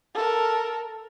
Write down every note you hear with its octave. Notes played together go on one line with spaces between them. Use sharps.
A4 A#4